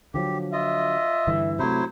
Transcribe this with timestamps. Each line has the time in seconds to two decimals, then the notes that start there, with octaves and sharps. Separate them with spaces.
0.14 D3 F3 F#3 G4
0.53 F4 D#5 E5
1.27 G2 D3 E3
1.59 C3 F#3 A3 E4 C5